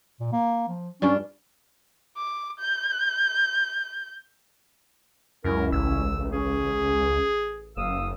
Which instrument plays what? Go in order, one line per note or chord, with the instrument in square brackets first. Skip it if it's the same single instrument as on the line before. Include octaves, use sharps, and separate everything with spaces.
[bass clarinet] A#2
A#3
F3
[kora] G2 D4 F4 [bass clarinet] C#4
[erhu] D6
G6
[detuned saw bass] C#2 [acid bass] F#2 [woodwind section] C#4 E4 [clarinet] A#4
[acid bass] A1 [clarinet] E6
[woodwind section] F#2 A3
[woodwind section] C#4 [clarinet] G#4
[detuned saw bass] F#1 [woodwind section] F5 D#6 E6